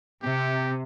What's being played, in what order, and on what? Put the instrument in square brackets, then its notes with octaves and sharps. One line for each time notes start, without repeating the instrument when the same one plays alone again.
[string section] C3 [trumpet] G4